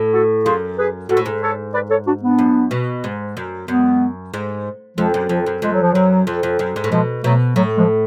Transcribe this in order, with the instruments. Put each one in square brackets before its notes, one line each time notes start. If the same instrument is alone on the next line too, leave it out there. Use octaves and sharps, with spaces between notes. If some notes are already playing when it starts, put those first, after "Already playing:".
Already playing: [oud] A2
[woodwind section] F#4 A4
[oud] F#2 [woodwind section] F4 G#4
[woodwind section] G#4 B4
[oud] G#2 [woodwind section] F#4 A4
[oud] A2
G#2
[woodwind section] A4 C#5
B4 D5
A4 C#5
D4 F#4
B3 D4
[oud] F#2
B2
G#2
F#2
[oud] F#2 [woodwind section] G#3 B3
[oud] G#2
[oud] F2 [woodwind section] F3 G#3
[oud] F#2
[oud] F2 [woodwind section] F3
[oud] F#2
[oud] F2 [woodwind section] G#3
[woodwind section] F#3
F3
[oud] F#2 [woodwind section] F#3
[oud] F2
F2
F#2
G#2
A2
[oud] B2 [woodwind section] F3 G#3
[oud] B2 [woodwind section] F#3 A3
[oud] A2 [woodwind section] F#3
[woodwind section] F3 G#3